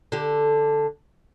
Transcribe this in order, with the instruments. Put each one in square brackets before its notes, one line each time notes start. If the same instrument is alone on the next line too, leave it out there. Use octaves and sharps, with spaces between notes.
[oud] D3 G4